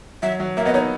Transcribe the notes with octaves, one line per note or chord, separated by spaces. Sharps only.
F#3 E5
F#3
A#3 E5
B3 D#5
D#4 C#5